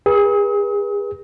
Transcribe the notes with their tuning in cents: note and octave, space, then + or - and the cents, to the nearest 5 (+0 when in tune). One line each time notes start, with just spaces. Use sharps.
G#4 -35 B4 -40 D#6 +40